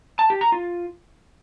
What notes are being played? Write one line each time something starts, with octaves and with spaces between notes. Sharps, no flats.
A5
G4
A#5
F4